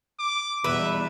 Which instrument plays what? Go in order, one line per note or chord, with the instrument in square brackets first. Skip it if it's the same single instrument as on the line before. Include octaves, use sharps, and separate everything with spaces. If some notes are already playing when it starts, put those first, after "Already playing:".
[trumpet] D6
[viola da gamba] E2 B2 G3 [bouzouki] B4 [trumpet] E5